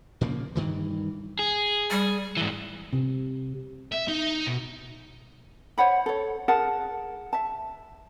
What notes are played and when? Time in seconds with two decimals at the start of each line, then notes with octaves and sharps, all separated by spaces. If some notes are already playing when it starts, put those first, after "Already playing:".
0.21 A#2 C#3 F3 A#3
0.55 G2 D#3 E3
1.39 G#4
1.90 G3
2.37 G#2 E3
2.93 C3
3.92 E5
4.08 D#4
4.46 B2
5.78 C5 C#5 F#5 B5
6.06 A4 C#5
6.48 G#4 A#4 F#5 A5
7.33 E5 A5